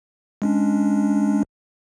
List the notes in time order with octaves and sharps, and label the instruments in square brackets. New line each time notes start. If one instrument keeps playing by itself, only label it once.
[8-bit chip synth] G#3 C#4 D4